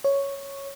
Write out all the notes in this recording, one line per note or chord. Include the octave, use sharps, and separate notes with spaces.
C#5